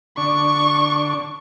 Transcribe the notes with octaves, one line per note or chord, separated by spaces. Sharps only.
D3 D4 C#6